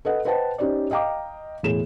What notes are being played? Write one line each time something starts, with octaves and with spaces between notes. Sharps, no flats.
A4 B4 D#5 F#5
B4 C5 D#5 F#5 G5 A5
C#4 D#4 G4 C5 D5
D#5 F5 G5 A#5 D6
E1 A2 G#4 E7